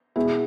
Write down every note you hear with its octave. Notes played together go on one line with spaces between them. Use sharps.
B2 G#3 B3 E4